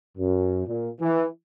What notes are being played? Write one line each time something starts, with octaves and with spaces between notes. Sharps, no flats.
F#2
A#2
E3